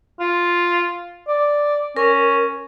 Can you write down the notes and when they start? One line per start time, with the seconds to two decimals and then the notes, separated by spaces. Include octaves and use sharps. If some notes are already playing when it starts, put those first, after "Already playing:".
0.20 F4
1.28 D5
1.97 C#4 A#4